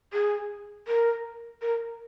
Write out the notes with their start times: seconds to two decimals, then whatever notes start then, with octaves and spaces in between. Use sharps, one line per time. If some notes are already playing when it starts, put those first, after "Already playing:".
0.13 G#4
0.88 A#4
1.62 A#4